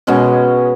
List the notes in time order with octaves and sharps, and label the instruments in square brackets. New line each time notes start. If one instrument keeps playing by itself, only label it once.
[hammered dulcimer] B2 G#3 C#4